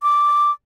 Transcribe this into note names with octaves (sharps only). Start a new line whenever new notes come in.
D6